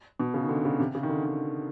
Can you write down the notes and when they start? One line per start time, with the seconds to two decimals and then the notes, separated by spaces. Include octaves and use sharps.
0.20 B2
0.34 C#3
0.43 D#3
0.49 D3
0.65 C#3
0.80 C3
0.95 C#3
1.03 D#3
1.09 D3
1.25 D#3